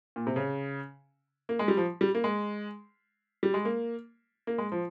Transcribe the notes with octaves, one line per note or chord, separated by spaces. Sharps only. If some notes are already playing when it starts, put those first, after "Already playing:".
A#2
C3
C#3
A#3
G#3
G3
F3
G3
A#3
G#3
G3
G#3
A#3
A#3
G#3
F3